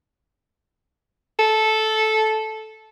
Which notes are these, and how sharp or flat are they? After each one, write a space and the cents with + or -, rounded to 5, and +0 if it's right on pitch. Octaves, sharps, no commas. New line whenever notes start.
A4 -10